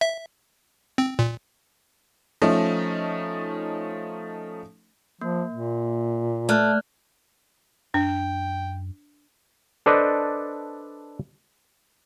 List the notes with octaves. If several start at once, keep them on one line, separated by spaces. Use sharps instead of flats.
E5
C4
A#2
F3 A3 C#4 D#4
F3 A#3
A#2
A3 D5 F6 F#6
F#2 D4 G5
D4 A4 B4 C5 D5 D#5